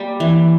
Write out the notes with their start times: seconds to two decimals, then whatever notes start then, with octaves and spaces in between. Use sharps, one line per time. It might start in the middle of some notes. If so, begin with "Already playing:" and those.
Already playing: G3 A#3
0.20 E3